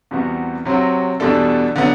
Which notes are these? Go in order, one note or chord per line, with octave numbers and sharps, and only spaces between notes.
E2 C3 G3 B3 F#4
C3 F#3 C4 F#4
E2 B2 G3 D4 A4
D3 F#3 B3